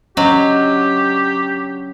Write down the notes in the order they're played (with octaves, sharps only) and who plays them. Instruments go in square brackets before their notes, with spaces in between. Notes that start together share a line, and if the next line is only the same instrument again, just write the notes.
[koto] F#3 [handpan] C#4 D4 [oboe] G4 [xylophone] D#5